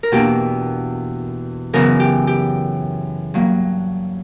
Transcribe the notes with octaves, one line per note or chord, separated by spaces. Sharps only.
A#4
E2 B2 A#3 D4 G4
F#2 C#3 E3 B3 A#4
G4
G4
G2 F#3 A#3